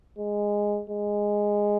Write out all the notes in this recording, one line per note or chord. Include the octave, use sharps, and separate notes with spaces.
G#3
G#3